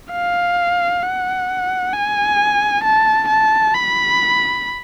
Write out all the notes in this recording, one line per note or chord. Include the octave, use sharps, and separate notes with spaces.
F5
F#5
G#5
A5
A5
B5